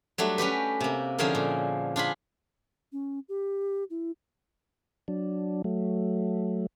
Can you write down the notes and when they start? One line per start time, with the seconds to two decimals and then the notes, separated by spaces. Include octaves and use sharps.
0.18 F#3 G3 A3 D4
0.38 C#4 F#4 G4 B4
0.80 C3 A#3
1.18 D3 F3 C#4 E4 G#4 A#4
1.35 A#2
1.96 D4 F4 G#4 B5
2.92 C#4
3.29 G4
3.90 E4
5.08 F#3 D4
5.64 F#3 A3